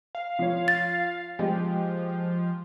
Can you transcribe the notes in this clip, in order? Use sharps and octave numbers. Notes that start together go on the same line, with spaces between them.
F5
F3 C#5
A6
F3 G#3 G4